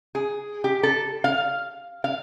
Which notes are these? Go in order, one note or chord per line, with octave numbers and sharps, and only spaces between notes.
G#4
G4
A4
F5
F5